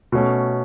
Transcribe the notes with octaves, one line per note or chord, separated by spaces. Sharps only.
B2 A3 C#4